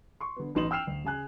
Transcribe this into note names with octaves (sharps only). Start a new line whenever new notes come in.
C6 C#6
D3 B3
A1 B3 D#4 C6 E7 F#7
G5 E6 F6 C7 E7 F7
D2
C#3 G#4 G#5 F#6